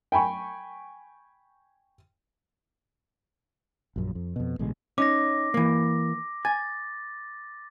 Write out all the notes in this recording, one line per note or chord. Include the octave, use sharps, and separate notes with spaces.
G5 G#5 B5 C#6
A#1 F#2
F2
F2 B2
A1 B2 D3 G#3
C#4 D#4 D6 A#6
E3 A#3
G#5 A6